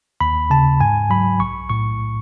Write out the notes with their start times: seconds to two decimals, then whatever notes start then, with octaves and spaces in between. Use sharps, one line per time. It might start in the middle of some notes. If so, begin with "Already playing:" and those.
0.21 D#2 B5
0.50 C#3 A5
0.80 G#2 G#5
1.10 F#3 B5
1.40 B1 C#6
1.69 A2 C#6